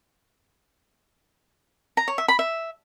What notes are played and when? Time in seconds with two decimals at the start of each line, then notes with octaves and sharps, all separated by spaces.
1.97 A#5
2.08 C#5
2.18 E5
2.28 B5
2.39 E5